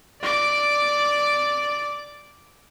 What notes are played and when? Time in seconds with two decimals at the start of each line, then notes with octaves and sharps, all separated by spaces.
0.22 D5 D6